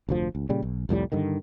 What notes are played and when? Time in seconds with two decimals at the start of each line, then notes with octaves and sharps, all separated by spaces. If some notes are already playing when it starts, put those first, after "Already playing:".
0.09 F1 D2 F3
0.35 C#2
0.49 A#2 C#3 G3
0.62 B1
0.89 C2 F2 A2 G3
1.12 G2 D3 D#3